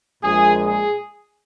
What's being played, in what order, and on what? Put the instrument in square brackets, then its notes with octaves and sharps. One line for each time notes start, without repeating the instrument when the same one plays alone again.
[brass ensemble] A#1 A#2 G#3 G#4
G#4